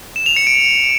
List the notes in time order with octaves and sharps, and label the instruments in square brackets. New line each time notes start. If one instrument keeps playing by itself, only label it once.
[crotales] E7
F7
C#7
D7